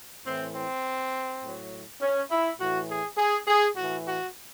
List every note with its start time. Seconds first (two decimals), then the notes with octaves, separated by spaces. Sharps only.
0.25 A2 E3 C4
0.54 C4
1.42 A2 F#3
2.01 C#4
2.30 E4
2.59 A2 E3 F#4
2.89 G#4
3.17 G#4
3.47 G#4
3.76 A2 E3 F#4
4.06 F#4